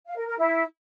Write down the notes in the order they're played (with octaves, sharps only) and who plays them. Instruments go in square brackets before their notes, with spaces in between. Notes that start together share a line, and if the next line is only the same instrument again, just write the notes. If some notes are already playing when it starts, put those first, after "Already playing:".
[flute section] F5
A#4
A#4
E4